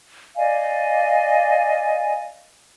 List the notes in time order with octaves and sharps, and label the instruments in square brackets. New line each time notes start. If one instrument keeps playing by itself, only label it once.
[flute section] D5 D#5 F5 G#5